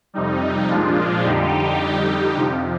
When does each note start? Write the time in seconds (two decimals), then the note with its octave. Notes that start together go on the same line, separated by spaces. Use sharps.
0.14 F2 C3 G3 D#4
0.69 A#2 F3 G#3 D4 F4
1.24 F2 D3 G3 D#4 G4
1.79 F2 D3 G3
2.36 F2 C3 F3